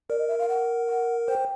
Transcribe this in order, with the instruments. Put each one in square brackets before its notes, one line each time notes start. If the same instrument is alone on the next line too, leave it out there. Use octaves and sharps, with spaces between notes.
[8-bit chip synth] A#4 [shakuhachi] D5
[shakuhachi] D#5
E5
F5
F#5
F#5
[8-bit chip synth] C5 [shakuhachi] G5